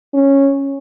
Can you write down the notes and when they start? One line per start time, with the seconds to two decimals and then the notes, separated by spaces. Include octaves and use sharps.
0.14 C#4